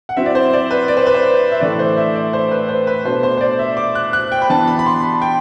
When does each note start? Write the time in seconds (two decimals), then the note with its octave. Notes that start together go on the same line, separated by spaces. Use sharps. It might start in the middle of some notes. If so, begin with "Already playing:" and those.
0.09 F#5
0.17 F#3 C4 E4 E5
0.26 D5
0.35 C5
0.53 D5
0.71 B4
0.88 D5
0.97 C5
1.06 B4
1.14 C5
1.52 E5
1.60 A2 E3 A3 D4 D5
1.79 C5
1.97 E5
2.15 D5
2.33 C5
2.51 B4
2.69 C5
2.87 B4
3.05 B2 A3 D4 C5
3.23 C5
3.37 C5
3.41 D5
3.59 E5
3.77 D6
3.95 F#6
4.13 F#6
4.32 G5
4.42 B5
4.50 E3 B3 D4 A5
4.67 B5
4.79 B5
4.86 C6
5.04 B5
5.22 G5